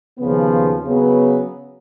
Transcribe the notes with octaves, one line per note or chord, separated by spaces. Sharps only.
D#2 C#3 F3 B3
C#3 F#3 B3